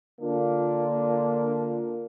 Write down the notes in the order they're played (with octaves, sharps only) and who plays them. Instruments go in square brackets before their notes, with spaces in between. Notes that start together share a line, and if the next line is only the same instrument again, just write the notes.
[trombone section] D3 A#3 D4 F4